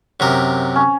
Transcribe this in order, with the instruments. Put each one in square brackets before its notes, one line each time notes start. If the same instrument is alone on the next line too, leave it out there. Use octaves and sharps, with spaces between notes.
[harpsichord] F#2 C3 A#4
[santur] C#4